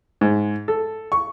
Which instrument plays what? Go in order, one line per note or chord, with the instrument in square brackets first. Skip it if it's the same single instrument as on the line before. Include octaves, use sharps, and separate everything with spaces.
[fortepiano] G#2
A4
C#6